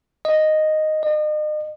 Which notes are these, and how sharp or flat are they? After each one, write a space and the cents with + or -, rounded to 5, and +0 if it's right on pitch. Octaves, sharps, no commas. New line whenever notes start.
D#5 -5
D#5 -40